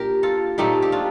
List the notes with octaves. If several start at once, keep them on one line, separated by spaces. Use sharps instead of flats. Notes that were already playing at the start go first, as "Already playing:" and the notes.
Already playing: A#2 D4 G4 A#4
F4 A4
A#2 A3 C4 D#4 G4
G4
D4 F4